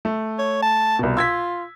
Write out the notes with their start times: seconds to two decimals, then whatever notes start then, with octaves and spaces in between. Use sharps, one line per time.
0.05 A3
0.39 C#5
0.62 A5
0.99 C2 B2
1.17 F4 E6 G#6 B6